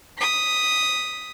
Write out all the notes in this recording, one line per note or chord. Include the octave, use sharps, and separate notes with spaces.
D#6 B6